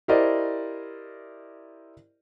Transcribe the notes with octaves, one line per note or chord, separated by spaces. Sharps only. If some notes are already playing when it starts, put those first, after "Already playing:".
E4 G4 A#4 C5 D5 D#5